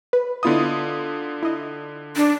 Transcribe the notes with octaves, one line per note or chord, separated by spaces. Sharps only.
B4
D3 B3 E4 F4 D#5 D#6
E4 D#5
D4